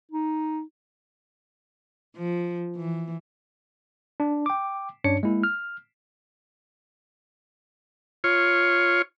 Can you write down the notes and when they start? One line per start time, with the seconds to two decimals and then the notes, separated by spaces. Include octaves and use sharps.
0.11 D#4
2.16 F3
2.76 E3
4.20 D4
4.46 G5 D6
5.04 G2 C#4 D4 C#5 C#7
5.23 G#3 A#3 E4
5.44 F6
8.24 F4 C#5